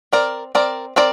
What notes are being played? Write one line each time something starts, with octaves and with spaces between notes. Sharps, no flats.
C4 A#4 D5
C4 A#4 D5
C4 A#4 D5